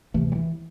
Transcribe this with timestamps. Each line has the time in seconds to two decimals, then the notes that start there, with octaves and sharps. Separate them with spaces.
0.14 D2 C3 E3 A3
0.32 G3
0.35 E3